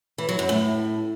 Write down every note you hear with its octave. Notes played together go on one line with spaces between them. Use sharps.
E3
F#3
F#2
A2